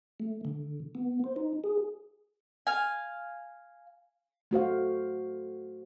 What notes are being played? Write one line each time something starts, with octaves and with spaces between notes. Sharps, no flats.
A3
D3
B3
C5
D#4
G#4
F5 G#5
A3 F#4 C5 F5